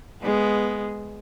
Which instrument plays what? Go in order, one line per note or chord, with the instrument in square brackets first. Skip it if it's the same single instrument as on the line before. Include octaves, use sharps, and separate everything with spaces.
[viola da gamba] G#3 B3